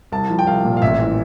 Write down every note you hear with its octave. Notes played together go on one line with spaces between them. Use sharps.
C2 A5
F3
G5
C2 F5
A#2
F5
A1 E5
E3